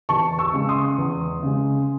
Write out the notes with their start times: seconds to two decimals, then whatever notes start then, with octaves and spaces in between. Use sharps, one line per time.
0.09 E2 A5 C#6
0.39 C#6 E6
0.53 C#3 G#3
0.69 C6 D#6
0.98 E2
1.43 C#3 G#3